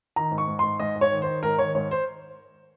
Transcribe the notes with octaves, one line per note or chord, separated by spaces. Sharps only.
D#3 A#5
G#2
C#6
G#2
G#2 C6
G#2 D#5
G#2
C#5
D#3
D#3 C5
G#2 A#4
D#3 C#5
G#2 C#5
C5